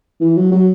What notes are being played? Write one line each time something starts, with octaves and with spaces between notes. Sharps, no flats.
E3
F#3
F#3